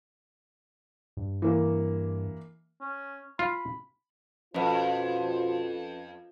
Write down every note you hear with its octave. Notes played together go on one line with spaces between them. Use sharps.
G2
E3 A#3
C#4
F4 B5
F2 B2 C#4 F4 B4 C5